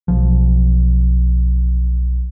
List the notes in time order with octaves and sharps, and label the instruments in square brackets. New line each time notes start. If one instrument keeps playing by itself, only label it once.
[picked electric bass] B1 F3